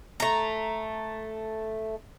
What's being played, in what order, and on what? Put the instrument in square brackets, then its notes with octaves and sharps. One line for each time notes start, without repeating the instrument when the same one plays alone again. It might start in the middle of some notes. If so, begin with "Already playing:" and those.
[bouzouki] A3 A#5